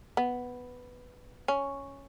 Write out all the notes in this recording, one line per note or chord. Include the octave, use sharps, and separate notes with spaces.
B3
C#4